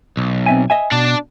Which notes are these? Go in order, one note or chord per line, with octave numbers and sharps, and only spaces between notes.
B1
C4 E5 G#5
D#5 E5 G#5
B2 D4 D5